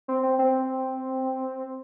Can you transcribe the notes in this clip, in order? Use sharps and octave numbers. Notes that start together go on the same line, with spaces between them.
C4
C4
C4